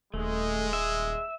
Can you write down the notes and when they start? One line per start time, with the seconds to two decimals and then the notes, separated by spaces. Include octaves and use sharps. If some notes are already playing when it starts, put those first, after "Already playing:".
0.14 D#1 G#3 A3
0.73 E5